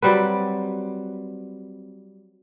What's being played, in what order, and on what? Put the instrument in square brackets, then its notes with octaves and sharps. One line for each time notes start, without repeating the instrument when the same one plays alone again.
[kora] F#3 G3 C4 B4